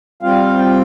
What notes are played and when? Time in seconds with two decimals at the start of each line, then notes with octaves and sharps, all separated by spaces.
0.22 G3 C4 F4 F5
0.58 G5